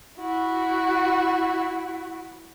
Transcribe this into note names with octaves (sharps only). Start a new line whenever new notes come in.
E4 F#4